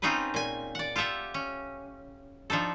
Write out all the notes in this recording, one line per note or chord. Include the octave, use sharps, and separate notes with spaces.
C4 C#4 D#4 F4 G#4 B4
A#2 G#5
D5 F#5
F4 G4 A4 E5 F#5
C#4
F3 D4 D#4 A4